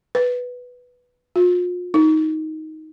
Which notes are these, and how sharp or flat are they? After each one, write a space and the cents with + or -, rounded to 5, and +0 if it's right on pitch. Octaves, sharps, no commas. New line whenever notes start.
B4 +0
F4 +40
D#4 +10